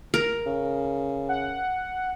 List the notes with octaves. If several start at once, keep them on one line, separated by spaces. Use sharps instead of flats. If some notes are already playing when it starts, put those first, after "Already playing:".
A#4
C#3
F#5